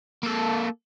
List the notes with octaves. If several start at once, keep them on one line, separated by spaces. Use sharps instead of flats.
A#3 A4